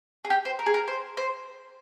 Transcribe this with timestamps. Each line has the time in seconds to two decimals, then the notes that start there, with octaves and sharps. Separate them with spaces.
0.25 G#4
0.30 G4
0.45 C5
0.59 A#4
0.66 G#4
0.74 A#4
0.88 C5
1.17 C5